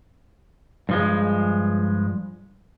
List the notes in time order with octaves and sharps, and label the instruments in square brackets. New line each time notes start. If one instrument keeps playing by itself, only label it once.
[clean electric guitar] G2 F3 G#3